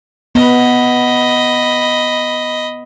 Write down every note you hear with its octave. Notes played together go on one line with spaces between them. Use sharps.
B3 D#5 B5